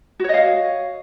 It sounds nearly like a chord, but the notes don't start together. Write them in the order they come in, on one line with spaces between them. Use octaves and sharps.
F#4 C#5 D#5 F5